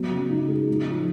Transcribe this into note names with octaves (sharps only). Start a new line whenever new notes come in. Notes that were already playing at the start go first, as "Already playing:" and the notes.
Already playing: F#3 B3
C#3
D#4
G#3
D#4
F3